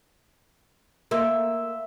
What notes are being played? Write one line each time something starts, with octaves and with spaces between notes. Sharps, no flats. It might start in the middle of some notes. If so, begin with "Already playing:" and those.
A#3 E5 C6